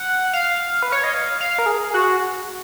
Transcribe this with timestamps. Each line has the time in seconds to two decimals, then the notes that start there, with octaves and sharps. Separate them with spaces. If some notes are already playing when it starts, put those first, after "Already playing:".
Already playing: F#5
0.33 F5
0.82 B4
0.92 C#5
1.04 D#5
1.14 F5
1.41 F5
1.59 A#4
1.66 G#4
1.94 F#4